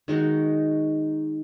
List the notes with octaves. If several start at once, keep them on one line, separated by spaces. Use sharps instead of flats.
D#3 G#3 D#4 F#4